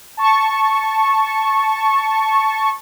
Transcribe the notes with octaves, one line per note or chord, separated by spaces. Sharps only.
A5 C#6